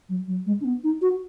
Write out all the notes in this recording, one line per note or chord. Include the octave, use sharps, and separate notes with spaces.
F#3
F#3
G#3
D4
B3
D#4
F#4